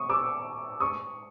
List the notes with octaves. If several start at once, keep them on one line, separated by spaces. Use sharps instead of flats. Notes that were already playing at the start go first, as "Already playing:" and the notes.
Already playing: C#6 D#6
D6 E6
C#6 D#6